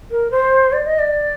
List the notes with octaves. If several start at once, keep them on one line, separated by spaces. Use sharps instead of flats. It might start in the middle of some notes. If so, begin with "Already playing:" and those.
A#4
C5
D5
D#5
D5